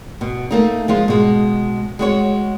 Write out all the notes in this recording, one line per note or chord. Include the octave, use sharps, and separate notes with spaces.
B2
A3 A#3 D#4
F3 G#3 F4
B2 G#3
G#3 F#4 C#5